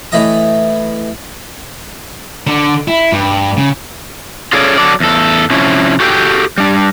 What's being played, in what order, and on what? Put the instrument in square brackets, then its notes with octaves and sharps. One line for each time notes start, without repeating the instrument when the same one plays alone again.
[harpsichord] A2 E3 E4 D#5 A#5 D#6
[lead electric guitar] D3
E4
G2
C#3
[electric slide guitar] C#4 F4 G#4 A4 C#5 D5
F#3 A4 D5
E2 A4
C3 F3 C#4 E4
F#4 G4 A4 F#5 G5
G3 D4